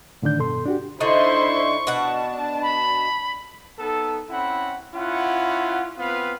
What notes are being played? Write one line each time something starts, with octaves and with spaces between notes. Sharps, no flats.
A2 D3 D#3 D4 G6
G2 B2 A4 C6
D4 F#4 G4
D3 D#4 E4 C5 D#5 C6 C#6
B2 D4 F#5 A5
B5
B3 D#4 A4
C4 C#4 E4 F#5 B5
C#4 E4 F4 F#5
B3 C4 F4 B4 F5